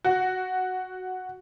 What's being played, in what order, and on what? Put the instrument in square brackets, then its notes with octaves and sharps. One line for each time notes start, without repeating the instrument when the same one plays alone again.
[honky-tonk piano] F#4